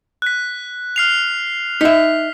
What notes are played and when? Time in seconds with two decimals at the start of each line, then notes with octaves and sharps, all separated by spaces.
0.22 F#6 B6
0.96 F6 C7 F7
1.81 D#4 E5 B6